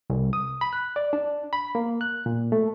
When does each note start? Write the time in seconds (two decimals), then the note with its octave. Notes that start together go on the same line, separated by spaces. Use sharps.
0.10 C2
0.33 D#6
0.61 B5
0.73 F#6
0.96 D5
1.13 D4
1.53 B5
1.75 A#3
2.01 F#6
2.26 A#2
2.52 A3